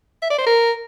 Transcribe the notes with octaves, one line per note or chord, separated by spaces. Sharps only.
E5
D5
C5
A#4